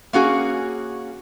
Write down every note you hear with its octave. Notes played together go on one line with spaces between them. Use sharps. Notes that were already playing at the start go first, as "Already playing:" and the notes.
A#3 C#4 F#4 G#4